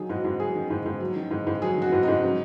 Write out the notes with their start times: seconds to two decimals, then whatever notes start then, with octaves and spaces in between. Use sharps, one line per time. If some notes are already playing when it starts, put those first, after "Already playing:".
Already playing: D#3 F#3 G#4
0.09 G#2 F#4
0.25 G#2
0.39 F#3 G#4
0.55 D#3
0.70 G#2
0.86 G#2
1.00 F#3
1.16 D#3
1.31 G#2
1.47 G#2
1.62 F#3 G#4
1.77 D#3 F#4
1.93 G#2
2.03 D#4
2.08 G#2
2.23 F#3